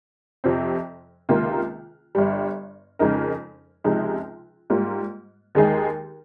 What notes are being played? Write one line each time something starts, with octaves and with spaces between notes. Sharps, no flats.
F2 C3 F3 C4
C#2 C3 D#3 A#3 F4
G1 G2 G3
F2 C#3 G#3 D#4 A#4
C#2 C3 F3 G#3 D#4
G#2 G3 A#3 F4
D#2 D#3 G#3 D#4 G#4